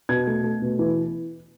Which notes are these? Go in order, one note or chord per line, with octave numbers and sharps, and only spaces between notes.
B2 G#6
A3
A3
B2
E3